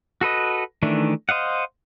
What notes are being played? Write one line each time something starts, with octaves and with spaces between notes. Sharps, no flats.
F#4 A4 B4 D#5
D#3 E3 A3 D4
C5 D#5 F5 F#5